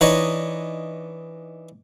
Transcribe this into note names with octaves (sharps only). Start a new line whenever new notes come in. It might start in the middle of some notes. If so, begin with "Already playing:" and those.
E3 D4 D#4 C#5 D#5